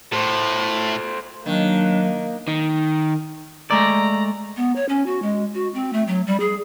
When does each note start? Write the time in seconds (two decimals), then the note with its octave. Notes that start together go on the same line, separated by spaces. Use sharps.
0.12 A2 A4 C5
1.46 D#3 F#3 A#3 D4
2.48 D#3
3.71 G#3 A3 D5 A#5
4.57 B3
4.76 C#5
4.89 C#4
5.06 F#4
5.22 G#3
5.54 F#4
5.74 C4
5.93 A3
6.08 F#3
6.27 G3
6.40 G#4